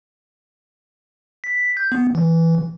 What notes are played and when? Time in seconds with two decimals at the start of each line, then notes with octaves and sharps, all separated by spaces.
1.44 B6
1.77 G6
1.92 B3
2.15 E3